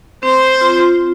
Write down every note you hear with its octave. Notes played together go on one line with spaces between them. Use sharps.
C4 C5
F4
F4